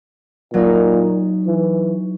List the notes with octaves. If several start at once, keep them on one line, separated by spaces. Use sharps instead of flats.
A#2 F#3 D#4
E3